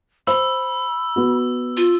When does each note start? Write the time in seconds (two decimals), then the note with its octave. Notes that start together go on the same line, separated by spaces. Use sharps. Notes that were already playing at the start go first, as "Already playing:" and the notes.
0.27 C5 B5 E6
1.16 B3 F#4
1.77 F4